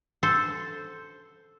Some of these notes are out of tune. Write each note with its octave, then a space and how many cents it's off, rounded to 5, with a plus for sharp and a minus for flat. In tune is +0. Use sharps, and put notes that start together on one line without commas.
A4 +0 C5 +0